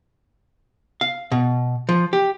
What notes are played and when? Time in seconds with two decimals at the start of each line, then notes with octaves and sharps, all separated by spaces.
1.01 F5
1.32 B2
1.89 F3
2.13 G4